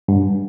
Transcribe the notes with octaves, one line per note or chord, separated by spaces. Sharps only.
G2